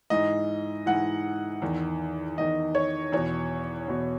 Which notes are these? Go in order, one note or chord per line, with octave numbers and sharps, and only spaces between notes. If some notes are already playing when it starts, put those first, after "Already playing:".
G#2 E3 D#5
G#2 E3 F#5
E2 D#3
E2 D#3 D#5
C#5
E2 B2 C#5
E2 B2